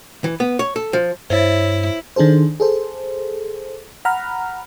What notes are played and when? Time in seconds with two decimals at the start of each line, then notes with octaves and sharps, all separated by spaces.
0.24 E3
0.40 B3
0.59 C#5
0.76 A4
0.93 F3
1.30 G2 E4 C5 C#5
2.16 D#3 D4 G#4 A4 C5
2.60 G#4 A4 C5
4.05 F#5 A#5 B5 F6